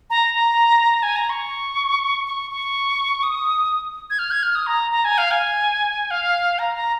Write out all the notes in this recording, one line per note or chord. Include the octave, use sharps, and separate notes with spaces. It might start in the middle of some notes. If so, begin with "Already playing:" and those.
A#5
A#5
G#5
A#5
C#6
C#6
C#6
D#6
G#6
F6
G#6
F6
D#6
A#5
A#5
G#5
F5
G#5
F5
A#5
A#5